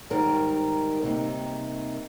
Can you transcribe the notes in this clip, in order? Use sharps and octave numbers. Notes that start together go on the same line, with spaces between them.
G#2 D#3 G3 A#4
C3 G3 A#3 D#4